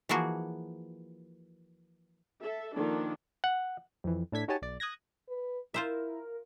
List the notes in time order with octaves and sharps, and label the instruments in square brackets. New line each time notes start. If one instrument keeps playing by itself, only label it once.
[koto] E3 F3 A#3 F#4 G#4
[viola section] A4 E5
D#3 F3 A#3 D4 A4
[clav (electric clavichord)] F#5
[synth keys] F2 E3
A2 D4 A4 G#6 B6
D#4 F#4 G4 C#5 G#5 A5
B1 D5
D#6 F#6 G#6 A#6
[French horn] B4
[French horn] E4 [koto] F4 C5 E5 [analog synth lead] A#4